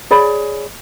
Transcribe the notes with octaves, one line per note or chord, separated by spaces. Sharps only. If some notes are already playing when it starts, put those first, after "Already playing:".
G#4 C#5 D5 B5